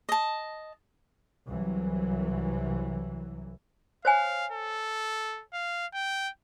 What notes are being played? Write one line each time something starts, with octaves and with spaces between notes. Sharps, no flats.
D#5 A5
C2 E3 F#3
C5 C#5 F5 G#5
A4
F5
G5